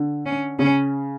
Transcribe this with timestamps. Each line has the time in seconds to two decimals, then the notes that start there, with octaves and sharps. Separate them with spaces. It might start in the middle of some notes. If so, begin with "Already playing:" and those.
Already playing: D3
0.26 C#4
0.59 C#3 C#4